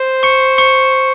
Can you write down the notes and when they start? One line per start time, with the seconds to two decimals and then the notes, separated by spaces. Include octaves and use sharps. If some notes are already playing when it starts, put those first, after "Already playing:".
Already playing: C5
0.23 C#6 C#7
0.58 C#6 C#7